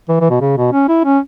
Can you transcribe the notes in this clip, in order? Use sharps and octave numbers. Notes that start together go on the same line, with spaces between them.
E3
E3
B2
C#3
B2
C#4
E4
C#4